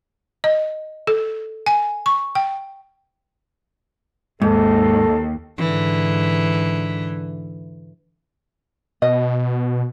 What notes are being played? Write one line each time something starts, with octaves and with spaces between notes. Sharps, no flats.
D#5
A4
G#5
C#6
G5
D#2 G#2 A4
G#2 D3 E3
B2 D#5